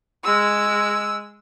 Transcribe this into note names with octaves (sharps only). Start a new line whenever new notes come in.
G#3 E6